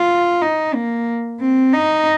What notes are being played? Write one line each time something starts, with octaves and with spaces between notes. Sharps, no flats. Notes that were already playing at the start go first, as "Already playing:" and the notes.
Already playing: F4
D#4
A#3
C4
D#4